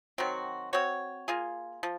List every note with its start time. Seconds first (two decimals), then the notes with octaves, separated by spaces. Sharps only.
0.18 D#3 F#3 C4 F#4
0.73 C4 F#4 C#5
1.28 A#3 F4 G#4
1.83 F3